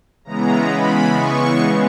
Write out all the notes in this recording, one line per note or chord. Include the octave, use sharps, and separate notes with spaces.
C#3 E3 G#3 B3 A#5
B5
C#6